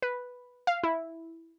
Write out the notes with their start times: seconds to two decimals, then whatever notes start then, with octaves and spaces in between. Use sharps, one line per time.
0.02 B4
0.67 F5
0.83 E4